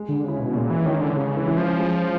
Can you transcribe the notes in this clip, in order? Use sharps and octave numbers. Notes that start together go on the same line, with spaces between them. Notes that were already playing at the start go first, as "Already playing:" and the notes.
Already playing: G#3
D3
C#3 C#4 E4
B2
A#2 G#3
E3
D#3 C#4 E4
D3
C#3 G#3
E3
C#4 E4
F3
G#3